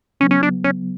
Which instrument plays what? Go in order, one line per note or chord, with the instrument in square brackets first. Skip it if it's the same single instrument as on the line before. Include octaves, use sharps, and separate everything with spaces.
[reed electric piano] C#3 F#3 B3 [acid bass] C#4
[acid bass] C#4
D4
C#4